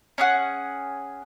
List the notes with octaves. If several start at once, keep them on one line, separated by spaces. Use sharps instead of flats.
C#4 G#4 F#5